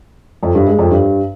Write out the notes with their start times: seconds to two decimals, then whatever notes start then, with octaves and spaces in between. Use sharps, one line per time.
0.43 F2
0.55 G2
0.67 G#3
0.79 F2
0.91 G2